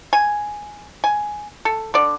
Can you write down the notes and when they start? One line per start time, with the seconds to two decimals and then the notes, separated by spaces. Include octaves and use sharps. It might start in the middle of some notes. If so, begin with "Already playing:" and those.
0.13 G#5
1.04 G#5
1.65 A4
1.94 D3 D5